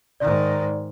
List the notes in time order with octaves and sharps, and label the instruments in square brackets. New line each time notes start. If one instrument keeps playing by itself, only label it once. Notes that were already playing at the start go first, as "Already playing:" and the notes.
[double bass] G#2 D#3 [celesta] D5